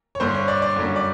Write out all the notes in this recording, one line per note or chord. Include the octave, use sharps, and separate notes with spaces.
C#5
G2 D3 G3 C5
C#5
D5
D5
F#2 D3 G3 C#5
D5